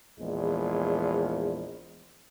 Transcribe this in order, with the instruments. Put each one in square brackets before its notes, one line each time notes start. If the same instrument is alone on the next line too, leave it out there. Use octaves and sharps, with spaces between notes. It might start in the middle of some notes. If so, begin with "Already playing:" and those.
[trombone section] A#1 E2 G#3